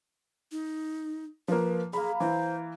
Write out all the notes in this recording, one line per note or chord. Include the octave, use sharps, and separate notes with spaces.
D#4
F3 A#3 B4
A#3 G#4 A#5 B5
E3 C5